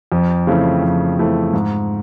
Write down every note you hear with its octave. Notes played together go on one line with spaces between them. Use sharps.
F2
C#3 E3 A3 C4
F2
C#3 E3 A3 C4
G#2